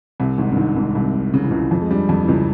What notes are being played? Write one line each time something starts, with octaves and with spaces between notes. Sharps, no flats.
C2 C3
G#1 G#2
G2
G#1 G#2
G#1 G#2
C2 C3
C#3
E3
C#2 C#3
F2 F3
G#3
G2 G3
F2 F3
E3
C#2 C#3